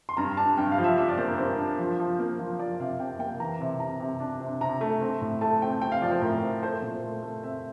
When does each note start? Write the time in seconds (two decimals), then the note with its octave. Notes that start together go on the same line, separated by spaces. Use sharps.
0.09 C6
0.17 G2 A#5
0.37 D4 A5
0.57 G2 G5
0.72 F5
0.78 F3
0.84 E5
0.98 D4 E5
1.08 D5
1.18 A#3 C5
1.28 A#4
1.38 G2 C5
1.58 D4
1.79 F3
1.99 F3
2.19 A#3
2.39 F3
2.59 F3 D5
2.80 C3 F5
2.99 C3 G5
3.19 A#3 G5
3.40 E3 A#5
3.61 C3
3.80 C3 A#5
4.00 C3
4.20 D4
4.40 C3
4.61 C3 A#5
4.81 A3
5.01 C4
5.21 A2
5.41 A3 A5
5.62 C4 G5
5.82 C4 G5
5.92 F5
6.02 F3 D5
6.11 C5
6.21 A2 A#4
6.42 C4
6.62 A3 C5
6.82 A#2
7.02 A3
7.22 A3
7.43 C4 E5